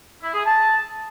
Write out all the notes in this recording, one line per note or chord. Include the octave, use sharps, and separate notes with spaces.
E4
G#4
A5